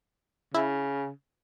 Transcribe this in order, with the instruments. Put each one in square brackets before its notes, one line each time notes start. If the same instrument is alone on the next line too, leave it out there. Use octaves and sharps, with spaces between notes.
[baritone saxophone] C#3 [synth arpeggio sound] E4